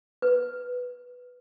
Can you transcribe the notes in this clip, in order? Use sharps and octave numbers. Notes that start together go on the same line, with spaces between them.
B4